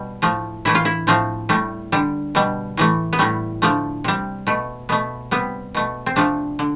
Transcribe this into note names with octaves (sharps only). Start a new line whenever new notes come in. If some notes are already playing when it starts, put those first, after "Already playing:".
Already playing: B2 G3
A2 F3 A3
A2 E3 A3 E4
F4
E4
A2 F3 A3 C4
A2 G3 A3
D3 G3
B2 G3
A2 E3 A3
B3
A2 G3 A3
D3 F3 A3
C3 G3
B2 A3
B2 A3 B3
C3 G3 B3
B2 A3
C4
C3 F3 A3 D4
D3